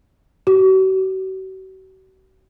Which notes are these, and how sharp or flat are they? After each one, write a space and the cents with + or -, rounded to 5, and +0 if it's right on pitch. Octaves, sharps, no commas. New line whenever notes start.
F#4 +40